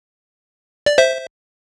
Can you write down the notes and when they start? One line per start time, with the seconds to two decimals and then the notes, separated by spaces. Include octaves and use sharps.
0.86 D5
0.98 C5 E5